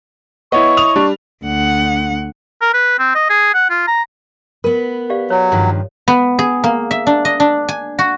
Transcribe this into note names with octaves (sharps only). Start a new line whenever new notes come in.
B3 E4 C#5 D#5 C#6
D#6 F7
G3 D4
D2 F#5
A#4
B4
C4
D#5
G#4
F#5
F4
A#5
B3 A#4 B4
G4 D5 F5
F#3 C#5
G2 D#3 F3
B3
G#4
A#3
E5
D4
D#5
D4
G#5
F#4